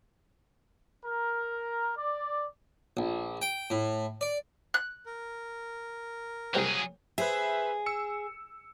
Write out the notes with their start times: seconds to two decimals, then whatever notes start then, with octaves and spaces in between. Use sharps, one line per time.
1.06 A#4
1.98 D5
2.97 A#1
3.42 G5
3.70 A2
4.21 D5
4.74 F#6
5.06 A#4
6.55 C2 F#3 G3 G#4 C5
7.18 G#4 B4 C5 E5
7.86 E6 C#7